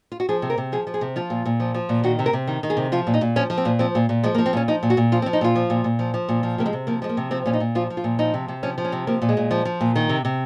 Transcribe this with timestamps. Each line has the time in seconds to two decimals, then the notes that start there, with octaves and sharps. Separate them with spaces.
0.12 F4
0.20 F#4
0.29 F3 G#4
0.42 C3
0.50 A#4
0.58 C3
0.72 F3 G#4
0.87 F3
0.94 G#4
1.01 C3
1.16 F3 F4
1.30 A#2
1.46 A#2
1.60 F3
1.74 F3
1.89 A#2
2.04 D#3 F#4
2.19 C3
2.26 A#4
2.33 C3
2.47 D#3
2.63 D#3
2.70 G#4
2.77 C3
2.92 F3 F4
3.07 A#2
3.14 D#4
3.21 A#2
3.36 F3 C#4
3.50 F3
3.57 C4
3.65 A#2
3.79 F3 C4
3.95 A#2
4.09 A#2
4.23 F3 G#3
4.35 A#3
4.38 F3
4.46 C4
4.53 A#2 C#4
4.68 F3 D#4
4.83 A#2
4.90 F#4
4.97 A#2
5.12 F3 F4
5.22 C4
5.26 F3
5.33 D#4
5.41 A#2 F4
5.56 F3
5.70 A#2
5.84 A#2
5.99 F3
6.14 F3
6.29 A#2
6.43 F3
6.58 C3 A#3
6.66 G#3
6.73 C3
6.87 F3 A#3
7.02 F3 G#3
7.09 A#3
7.17 C3
7.31 F3 C4
7.46 A#2 C#4
7.53 D#4
7.60 A#2
7.75 F3 F4
7.90 F3
7.97 F4
8.04 A#2
8.19 F3 D#4
8.34 C3
8.48 C3
8.63 F3 C#4
8.78 F3
8.85 C#4
8.92 C3
9.07 F3 A#3
9.22 A#2
9.29 G#3
9.37 A#2
9.51 F3
9.65 F3
9.81 A#2
9.96 D#3
10.09 C3
10.25 C3